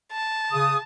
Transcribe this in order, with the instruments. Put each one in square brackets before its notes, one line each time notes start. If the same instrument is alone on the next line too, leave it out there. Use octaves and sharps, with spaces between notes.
[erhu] A5
[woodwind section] C#3 D#6